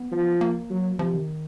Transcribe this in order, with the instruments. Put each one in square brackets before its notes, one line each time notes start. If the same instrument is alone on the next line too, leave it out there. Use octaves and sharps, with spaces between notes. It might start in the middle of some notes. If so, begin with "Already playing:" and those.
Already playing: [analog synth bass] B3
[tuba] F3
[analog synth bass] A#3
[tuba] F#3
[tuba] C3 [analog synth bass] F3
[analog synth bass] D#3